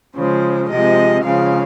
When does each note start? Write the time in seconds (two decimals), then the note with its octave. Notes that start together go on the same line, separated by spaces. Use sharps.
0.16 C#3 F3 G#3 C5
0.70 C3 F3 G#3 D#5
1.23 C#3 F3 G#3 F5